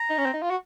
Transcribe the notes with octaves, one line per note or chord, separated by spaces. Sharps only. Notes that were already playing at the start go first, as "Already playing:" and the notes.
Already playing: A#5
D#4
C#4
C4
D#4
F4
F#4